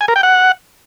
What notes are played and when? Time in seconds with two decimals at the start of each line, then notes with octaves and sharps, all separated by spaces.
0.01 G#5
0.08 A#4
0.16 G5
0.23 F#5